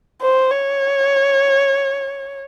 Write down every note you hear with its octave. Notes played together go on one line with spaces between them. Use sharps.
C5
C#5